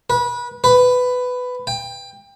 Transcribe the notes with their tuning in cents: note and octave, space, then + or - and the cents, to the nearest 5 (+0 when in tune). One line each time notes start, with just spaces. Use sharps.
B4 -25
B4 +15
G5 +25